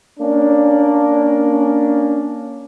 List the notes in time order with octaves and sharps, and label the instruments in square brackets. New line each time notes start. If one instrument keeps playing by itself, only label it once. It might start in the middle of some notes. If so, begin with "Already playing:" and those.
[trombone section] A#3 C#4 D4